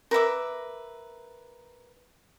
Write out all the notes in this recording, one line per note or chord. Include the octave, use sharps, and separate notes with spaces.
A#4 B4 E5 D6